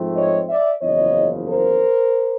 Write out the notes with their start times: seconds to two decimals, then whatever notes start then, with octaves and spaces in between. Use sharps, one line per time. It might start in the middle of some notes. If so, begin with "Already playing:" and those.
Already playing: G#2 F3 A3 C4
0.15 C#5 D#5
0.49 D5 E5
0.82 F#1 E2 C#3 F3 C#5 D#5
1.48 A#4 C5